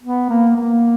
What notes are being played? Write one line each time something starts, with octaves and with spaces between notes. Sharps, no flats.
B3
A#3
A#3